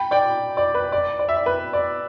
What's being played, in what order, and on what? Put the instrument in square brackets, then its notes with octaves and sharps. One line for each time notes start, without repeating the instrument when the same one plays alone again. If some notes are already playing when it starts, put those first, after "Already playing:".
Already playing: [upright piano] G5 B5
D5 G5
D5
B4
D5
D5
E5
D5
B4
D5